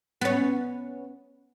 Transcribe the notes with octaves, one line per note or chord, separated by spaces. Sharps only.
B3 C#4